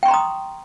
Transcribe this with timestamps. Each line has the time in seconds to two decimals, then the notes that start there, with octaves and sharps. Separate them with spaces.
0.03 G5
0.05 C#6
0.08 C6
0.11 A#5
0.14 D#6